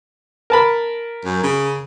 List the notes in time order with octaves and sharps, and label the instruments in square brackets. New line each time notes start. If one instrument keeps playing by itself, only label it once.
[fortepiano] A#4 A5 B5
[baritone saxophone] F#2
C#3